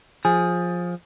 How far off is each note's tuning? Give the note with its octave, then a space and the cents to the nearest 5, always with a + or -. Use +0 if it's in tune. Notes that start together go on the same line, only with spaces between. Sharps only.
F3 +15 G#4 +0